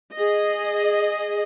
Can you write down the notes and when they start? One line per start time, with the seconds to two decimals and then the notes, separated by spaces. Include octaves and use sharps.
0.13 G#4 D#5